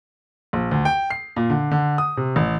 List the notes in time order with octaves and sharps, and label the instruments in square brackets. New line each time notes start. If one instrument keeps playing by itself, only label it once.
[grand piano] A#1
D2
G5
C7
A#2
D3
D3
D#6
C3
A1